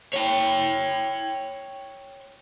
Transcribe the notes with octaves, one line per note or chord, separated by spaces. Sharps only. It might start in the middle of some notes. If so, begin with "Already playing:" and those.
C#5 G5